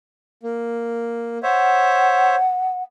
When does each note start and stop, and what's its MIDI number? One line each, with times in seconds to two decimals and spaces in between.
0.43 1.38 58
1.43 2.36 72
1.43 2.36 73
1.43 2.36 76
1.43 2.83 78